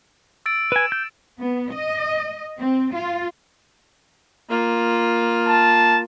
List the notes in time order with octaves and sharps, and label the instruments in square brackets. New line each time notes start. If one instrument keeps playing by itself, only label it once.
[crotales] E6 A6 D7
[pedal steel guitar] B4 G#5 [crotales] E7
[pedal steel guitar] G6
[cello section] B3
D#5
C4
F4
[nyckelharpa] A#3 F4
[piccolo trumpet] A5